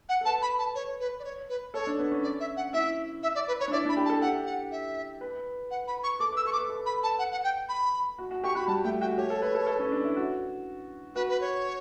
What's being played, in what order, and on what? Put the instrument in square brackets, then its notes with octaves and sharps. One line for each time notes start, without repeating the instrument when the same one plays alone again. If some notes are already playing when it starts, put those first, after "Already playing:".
[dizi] F#5
[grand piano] A4
[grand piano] B4 [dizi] A5
[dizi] B5
A5
C#5
B4
D5
C#5
B4
[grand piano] A4 [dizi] C#5
[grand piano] D4
B3
C#4
[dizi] D5
E5
F#5
[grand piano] E4 [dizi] E5
[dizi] E5
D5
B4
C#5
[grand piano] D4
[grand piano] E4 [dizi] D5
[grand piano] D4
[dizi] B5
[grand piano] G4
[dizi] A5
[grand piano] A4
[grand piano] G4 [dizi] F#5
[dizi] F#5
E5
[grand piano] B4
[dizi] F#5
B5
C#6
[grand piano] A4 [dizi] D6
[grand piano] B4
[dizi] E6
[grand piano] A4 [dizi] C#6
[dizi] D6
[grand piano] B4
A4
[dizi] B5
A5
F#5
F#5
G5
B5
[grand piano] F#4
F#4
[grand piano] G4 [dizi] C#6
[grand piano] F#4 [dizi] B5
[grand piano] G3 [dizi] A5
[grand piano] A3 [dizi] G5
[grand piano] F#4 [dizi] G5
[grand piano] G4 [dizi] C#5
[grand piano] A4
B4
A4
A4
C#4
D4
E4
F#4
[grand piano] F#4 [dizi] B4
[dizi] B4
C#5